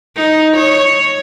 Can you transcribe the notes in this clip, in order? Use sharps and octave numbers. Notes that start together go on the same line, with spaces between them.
D#4
C#5